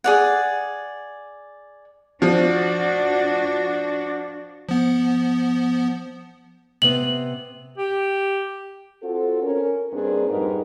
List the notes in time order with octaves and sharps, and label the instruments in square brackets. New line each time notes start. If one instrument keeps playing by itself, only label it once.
[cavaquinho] G#4 D5 F#5
[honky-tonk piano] F3 [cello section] D4 F#4
[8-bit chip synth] F3 B3
[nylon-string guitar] C3 B3 [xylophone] F#7
[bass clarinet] G4
[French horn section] C4 F4 F#4 A4
C#4 A#4
G2 A#3 C4 D4 D#4 G#4
F2 G#2 G3 D#4 A#4 B4